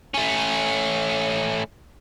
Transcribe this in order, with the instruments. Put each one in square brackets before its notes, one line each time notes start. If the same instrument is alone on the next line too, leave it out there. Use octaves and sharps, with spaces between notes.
[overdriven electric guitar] A3 C#4